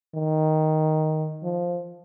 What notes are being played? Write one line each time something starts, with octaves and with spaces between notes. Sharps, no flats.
D#3
F3